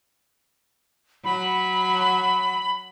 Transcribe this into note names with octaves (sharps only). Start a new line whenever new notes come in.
F#3 B5